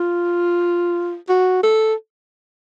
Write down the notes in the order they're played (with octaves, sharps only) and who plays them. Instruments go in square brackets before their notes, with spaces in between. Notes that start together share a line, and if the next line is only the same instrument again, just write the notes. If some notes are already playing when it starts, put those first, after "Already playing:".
Already playing: [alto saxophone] F4
F#4
A4